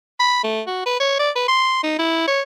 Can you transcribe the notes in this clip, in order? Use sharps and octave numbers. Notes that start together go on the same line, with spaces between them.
B5
A3
F#4
B4
C#5
D5
B4
C6
D#4
E4
C#5